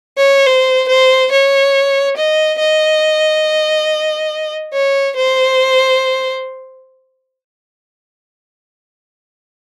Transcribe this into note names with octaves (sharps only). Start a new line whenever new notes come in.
C#5
C5
C5
C#5
D#5
D#5
C#5
C5